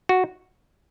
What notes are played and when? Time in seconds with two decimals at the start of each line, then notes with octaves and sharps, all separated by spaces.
0.09 F#4